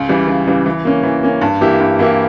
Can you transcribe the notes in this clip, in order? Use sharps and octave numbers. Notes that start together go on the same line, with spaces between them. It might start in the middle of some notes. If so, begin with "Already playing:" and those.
Already playing: C#2
C#3 E3 G3
C#2
C#3 E3 G3
E3
A#3 C#4
E3
A#3 C#4
G2
E3 A#3 E4 G4
G2
E3 A#3 E4 G4